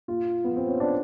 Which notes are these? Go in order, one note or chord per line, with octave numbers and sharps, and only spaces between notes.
A#2 F4
B3
F3
C4
C#4
D4